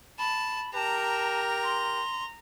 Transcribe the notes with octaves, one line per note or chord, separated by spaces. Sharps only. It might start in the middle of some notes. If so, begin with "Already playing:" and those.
A5 B5
G4 A#4 A5 A#5
C6